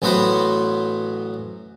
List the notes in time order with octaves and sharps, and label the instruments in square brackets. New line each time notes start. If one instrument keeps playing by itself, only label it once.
[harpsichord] A1 F#3 B3 F#4 B4 C5